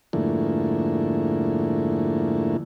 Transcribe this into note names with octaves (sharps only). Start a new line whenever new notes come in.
F2 G#2 D3 A3 A#3 E4